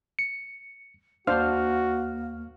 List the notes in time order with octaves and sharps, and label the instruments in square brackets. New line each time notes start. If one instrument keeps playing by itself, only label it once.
[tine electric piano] C#7
[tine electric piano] D#2 F6 [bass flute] A#3 [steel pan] D4 C5 F5 [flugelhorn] F#4